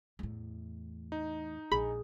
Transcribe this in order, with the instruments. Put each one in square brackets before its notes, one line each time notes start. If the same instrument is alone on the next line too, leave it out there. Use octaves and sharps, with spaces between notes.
[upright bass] E2 A2
[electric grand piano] D#4
[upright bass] A#1 [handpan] G#4 [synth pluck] B5